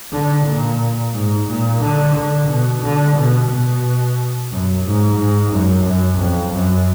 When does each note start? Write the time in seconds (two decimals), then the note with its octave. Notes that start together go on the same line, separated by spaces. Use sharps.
0.12 D3
0.46 A#2
1.13 G#2
1.47 A#2
1.81 D3
2.15 D3
2.48 B2
2.83 D3
3.17 B2
3.49 B2
4.51 F#2
4.85 G#2
5.18 G#2
5.52 F#2
5.85 F#2
6.19 F2
6.53 F#2